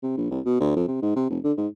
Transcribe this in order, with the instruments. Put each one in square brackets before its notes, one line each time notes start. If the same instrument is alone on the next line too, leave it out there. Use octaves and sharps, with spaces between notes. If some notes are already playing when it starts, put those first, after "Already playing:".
[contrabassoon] C3
A#1
C2
B2
D2
F2
C3
G#2
C3
F1
D3
G#2